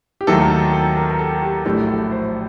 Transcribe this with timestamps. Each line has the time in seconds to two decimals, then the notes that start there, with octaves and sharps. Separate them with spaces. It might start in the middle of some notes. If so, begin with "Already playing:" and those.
0.21 G4
0.27 D#2 D#3 F#3 A3 A4
0.41 A#4
0.50 A4
0.73 A4
0.97 A#4
1.10 A#4
1.19 A4
1.42 G4
1.65 A#1 A2 F#3 A3 G4
1.88 A4
2.12 C5